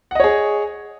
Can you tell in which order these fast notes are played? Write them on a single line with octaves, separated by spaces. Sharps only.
F#5 D#5 C#5 G#4